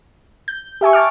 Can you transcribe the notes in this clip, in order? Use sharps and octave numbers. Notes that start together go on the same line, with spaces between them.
G6
G4 E5 G#5 C#6
G5 A5 D6 F6